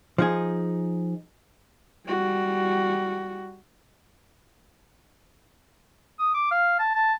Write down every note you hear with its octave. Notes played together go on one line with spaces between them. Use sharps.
F3 D#4 G#4
G3 F#4
D#6
D6
F5
A5
A5